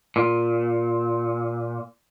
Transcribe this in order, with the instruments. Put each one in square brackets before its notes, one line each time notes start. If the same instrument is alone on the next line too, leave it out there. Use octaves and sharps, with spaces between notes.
[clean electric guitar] A#2